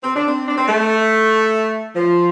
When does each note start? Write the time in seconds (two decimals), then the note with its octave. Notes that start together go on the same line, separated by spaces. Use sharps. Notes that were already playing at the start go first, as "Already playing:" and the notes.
0.04 C4
0.16 D4
0.28 C4
0.48 D4
0.58 C4
0.68 A3
1.96 F3